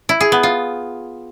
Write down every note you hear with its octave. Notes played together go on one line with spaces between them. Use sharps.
E4
G#4
B3
F4